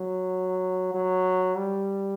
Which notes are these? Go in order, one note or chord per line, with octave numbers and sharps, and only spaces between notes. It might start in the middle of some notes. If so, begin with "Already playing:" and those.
Already playing: F#3
F#3
G3